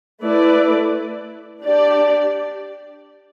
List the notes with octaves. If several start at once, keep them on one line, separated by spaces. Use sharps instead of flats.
A3 E4 B4 D5
D4 G4 D5